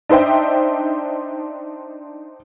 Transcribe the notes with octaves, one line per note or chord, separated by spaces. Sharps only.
D4 D#4 C5 E5 G5